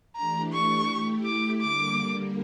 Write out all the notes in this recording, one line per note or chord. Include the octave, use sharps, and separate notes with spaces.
E3 A3 D4 G4 A#5
C#6
A3 E4 G4
D6
D3 G3 A#3 D6